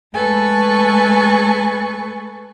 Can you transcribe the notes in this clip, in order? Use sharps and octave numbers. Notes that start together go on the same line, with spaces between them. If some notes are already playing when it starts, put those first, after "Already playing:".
G#3 A3 A4 B4 G#5 C#6